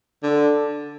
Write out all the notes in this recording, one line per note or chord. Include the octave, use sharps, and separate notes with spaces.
D3